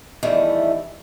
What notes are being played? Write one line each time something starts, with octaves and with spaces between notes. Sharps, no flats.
E2 D#3 E3 G3 A3